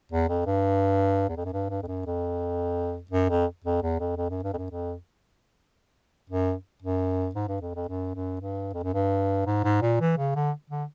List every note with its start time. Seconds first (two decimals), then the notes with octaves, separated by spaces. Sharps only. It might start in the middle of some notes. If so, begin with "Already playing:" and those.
0.12 E2
0.29 F2
0.46 G2
1.29 E2
1.37 F2
1.45 F#2
1.53 G2
1.70 G2
1.83 F2
1.87 F#2
2.06 F2
3.11 F#2
3.30 F2
3.64 F2
3.82 E2
4.00 F2
4.17 F2
4.30 F#2
4.44 G2
4.53 F2
4.57 F#2
4.71 F2
6.30 F#2
6.82 F#2
7.35 G#2
7.48 G2
7.61 F2
7.76 F2
7.88 F#2
8.15 F#2
8.41 G2
8.74 F2
8.84 F#2
8.94 G2
9.47 G#2
9.64 G#2
9.82 A#2
10.01 E3
10.18 C#3
10.35 D3
10.70 D3